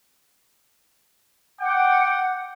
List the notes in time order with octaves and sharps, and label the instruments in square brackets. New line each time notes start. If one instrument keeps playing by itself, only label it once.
[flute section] F#5 [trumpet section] G5 D6